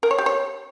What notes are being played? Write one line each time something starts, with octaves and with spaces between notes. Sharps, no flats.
A#4
C#5
G4
C#5